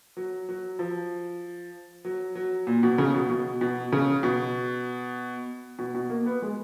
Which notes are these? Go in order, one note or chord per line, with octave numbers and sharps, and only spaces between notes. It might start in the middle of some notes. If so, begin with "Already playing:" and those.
F#3
F#3
F3
F#3
F#3
A#2
B2
C#3
B2
B2
B2
C#3
B2
B2
B2
A#3
B3
G#3